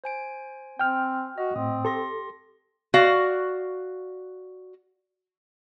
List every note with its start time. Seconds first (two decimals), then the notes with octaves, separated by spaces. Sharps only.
0.04 C5 G#5 D7
0.79 C4 G5 F6
1.38 F#4 D#5
1.56 A2 C4 D#6
1.85 G4 A4 C6 A#6
2.94 F#4 D5 F5